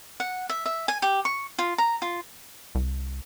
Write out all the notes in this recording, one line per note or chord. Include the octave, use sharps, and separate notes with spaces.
F#5
E5
E5
G#5
G4
C#6
F4
A#5
F4
C2